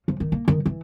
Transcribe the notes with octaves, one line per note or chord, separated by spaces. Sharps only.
F3
D#3
A#3
D#3
E3